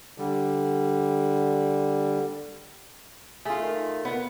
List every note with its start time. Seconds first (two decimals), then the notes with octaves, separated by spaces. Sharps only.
0.18 D3 G3
3.45 A3 F4 G#4
3.62 D#3
4.05 A#2 B3